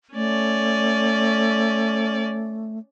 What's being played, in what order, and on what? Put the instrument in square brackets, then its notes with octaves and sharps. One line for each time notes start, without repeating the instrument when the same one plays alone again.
[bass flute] A3 [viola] C#4 D5